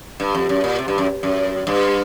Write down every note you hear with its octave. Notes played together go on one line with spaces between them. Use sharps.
G2
F2
F#2
A#2
C3
G2
F#2
F#2
G2